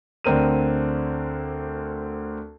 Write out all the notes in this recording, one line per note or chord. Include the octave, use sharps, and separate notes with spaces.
D2 D3 C4 A#4 D#7